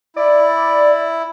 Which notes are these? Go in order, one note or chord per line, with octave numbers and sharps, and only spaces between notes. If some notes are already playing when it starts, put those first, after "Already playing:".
E4 D5